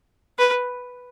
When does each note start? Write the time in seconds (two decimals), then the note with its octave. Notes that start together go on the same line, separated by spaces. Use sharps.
0.38 B4